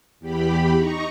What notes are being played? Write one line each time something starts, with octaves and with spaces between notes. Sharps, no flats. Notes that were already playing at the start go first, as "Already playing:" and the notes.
E2 G4 B5
D#4 A#5 C#6